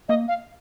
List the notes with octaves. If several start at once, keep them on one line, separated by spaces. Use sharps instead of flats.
A#3 D#5
F5